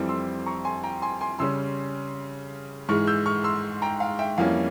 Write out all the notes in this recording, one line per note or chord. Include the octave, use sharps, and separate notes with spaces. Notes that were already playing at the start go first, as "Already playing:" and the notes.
Already playing: F2 E3 G3 C4
C6 E6
A#5 C#6
G#5 C6
G5 A#5
G#5 C6
G#5 C6
C#3 G3 C#4 C6 E6
G#2 E3 G#3 C#6 F6
E6 G6
C#6 F6
C6 E6
G5 A#5
F5
E5 G5
F2 E3 G3 A#3 C#4 F5